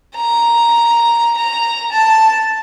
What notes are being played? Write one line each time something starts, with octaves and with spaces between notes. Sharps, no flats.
A#5
A#5
A5